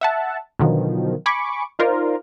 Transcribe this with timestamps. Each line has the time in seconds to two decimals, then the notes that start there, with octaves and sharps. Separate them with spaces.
0.01 E5 F#5 A5
0.59 B2 D3 D#3 F3 F#3
1.26 G#5 B5 C#6 D6
1.79 D#4 F4 A#4 C5 D5